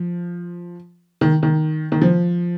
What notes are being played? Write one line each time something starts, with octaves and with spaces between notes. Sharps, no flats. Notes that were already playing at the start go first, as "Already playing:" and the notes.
Already playing: F3
D#3
D#3
D#3
F3